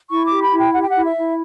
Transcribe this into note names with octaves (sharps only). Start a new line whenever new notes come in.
E4 C#6
D6
G4
B5
E4
G5
G4 F#5
G5
F#5
E4
E5
E4